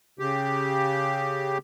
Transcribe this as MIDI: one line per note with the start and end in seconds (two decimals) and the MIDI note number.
0.19 1.58 49
0.19 1.58 67